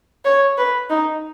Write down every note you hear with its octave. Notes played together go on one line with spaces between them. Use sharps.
C#5
B4
D#4